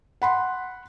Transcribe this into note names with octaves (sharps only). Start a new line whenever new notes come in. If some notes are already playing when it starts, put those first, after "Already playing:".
F#5 B5 C6